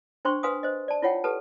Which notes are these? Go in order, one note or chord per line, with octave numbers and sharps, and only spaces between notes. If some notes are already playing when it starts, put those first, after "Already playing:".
D4 C5 G5 C6 C#6
B4 F5 G#5 C6 D#6
C5 D#5
D5 A5
E4 F4 C#5 F#5 G5
G4 A4 B4 A5